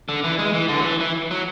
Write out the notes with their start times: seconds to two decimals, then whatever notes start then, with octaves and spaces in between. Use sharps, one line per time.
0.09 D3
0.24 E3
0.39 G#3
0.54 E3
0.69 D3
0.80 F#3
0.85 E3
1.00 E3
1.31 F#3